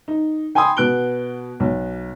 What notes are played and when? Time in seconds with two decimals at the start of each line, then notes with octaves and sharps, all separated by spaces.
0.08 D#4
0.55 G5 G#5 B5 C6 D#6
0.77 B2 B3 F#6 D7 G7
1.60 B1